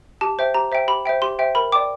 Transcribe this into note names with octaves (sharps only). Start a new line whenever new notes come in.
G4 A5
C5 E5 G5
G4 A#5
C5 E5 G5
G4 B5
C5 E5 G5
G4 C6
C5 E5 G5
A#4 B5
D5 G5 D6